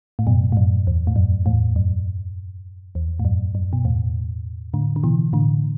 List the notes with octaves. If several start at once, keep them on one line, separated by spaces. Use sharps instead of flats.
A2
F#2 B2
A2
F#2
E2
A2
F#2
E2 A2
F#2
E2
A2
F#2
F#2
B2
E2 A2
A2 D3
D3
B2 E3
A2 D3